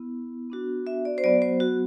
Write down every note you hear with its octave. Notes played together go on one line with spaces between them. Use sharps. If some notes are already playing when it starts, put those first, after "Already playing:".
Already playing: B3 E4
B3 D4 F#4
E5
D5
C5
F#3 B3 F#4 D5
C5
F#4